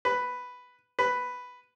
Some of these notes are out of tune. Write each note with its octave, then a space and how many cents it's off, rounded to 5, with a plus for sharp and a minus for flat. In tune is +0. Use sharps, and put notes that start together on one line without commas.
B4 +5
B4 +5